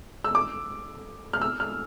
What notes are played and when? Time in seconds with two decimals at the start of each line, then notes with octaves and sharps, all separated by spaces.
0.24 E6
0.35 D6
1.33 F6
1.41 E6
1.60 F6